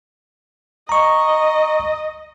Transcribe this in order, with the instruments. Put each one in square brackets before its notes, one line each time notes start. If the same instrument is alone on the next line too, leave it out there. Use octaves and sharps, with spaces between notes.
[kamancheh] D#5 [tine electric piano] A#5 C#6